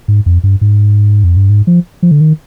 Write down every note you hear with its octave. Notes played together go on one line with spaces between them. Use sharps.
G#2
F2
G2
G#2
F2
G2
G#2
F3
F3
D3
D#3